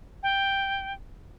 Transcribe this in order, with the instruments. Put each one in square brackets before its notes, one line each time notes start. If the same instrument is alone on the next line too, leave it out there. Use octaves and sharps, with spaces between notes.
[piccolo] G5